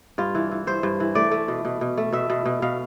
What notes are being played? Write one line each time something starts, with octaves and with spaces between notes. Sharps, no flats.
G2 F4
E3
E3
G2 C5
G2
E3
A3 D5
A3
B2
B2
B2
A3
B2 E5
B2
B2
B2 F5